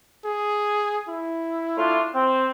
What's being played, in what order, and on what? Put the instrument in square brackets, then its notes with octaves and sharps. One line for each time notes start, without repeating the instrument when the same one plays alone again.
[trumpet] G#4
E4
[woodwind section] A3 D4 F4
C4